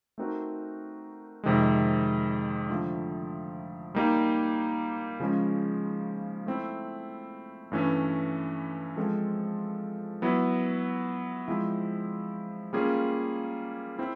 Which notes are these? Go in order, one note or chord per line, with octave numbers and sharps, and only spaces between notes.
A3 C4 D#4 F#4 A#4
F2 C3 D#3 G#3
D3 F3 A3
G3 A#3 D#4 G4
C#3 F3 G#3 C#4
A3 C4 E4
G2 E3 A3 C#4
F3 G#3 C4 F4 A4
F#3 B3 E4
F3 G#3 C4 E4
G3 A#3 C#4 F4 G#4
C4 E4